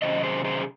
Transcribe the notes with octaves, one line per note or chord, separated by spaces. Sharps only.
C3 D#3 F#3 C#4 C5 D#5
G#4 C5
G#4 C5